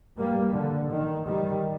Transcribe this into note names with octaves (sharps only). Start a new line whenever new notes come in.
G2 G3 A#3
D3
D#3
D#3 G3